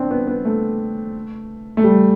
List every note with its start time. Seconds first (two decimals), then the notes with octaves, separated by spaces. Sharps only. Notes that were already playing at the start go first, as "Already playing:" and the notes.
Already playing: C4 D4
0.11 B3
0.27 B3
0.45 A3
1.77 A3
1.84 G3